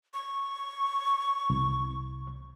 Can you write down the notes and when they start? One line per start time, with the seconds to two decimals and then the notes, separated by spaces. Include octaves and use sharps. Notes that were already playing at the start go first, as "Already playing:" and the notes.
0.14 C#6
1.50 C2